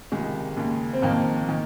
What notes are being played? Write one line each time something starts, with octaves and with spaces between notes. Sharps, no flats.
C#2 C3 D#3 G#3
D#2 C#3
C4
F2 D#3 A#3
D#3